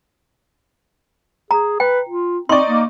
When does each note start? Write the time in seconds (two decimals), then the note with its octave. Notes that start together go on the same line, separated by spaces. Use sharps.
1.51 G#4 A#5
1.80 B4 G5
2.09 F4
2.49 C4 D#4 D5 C6 C#6
2.66 A#3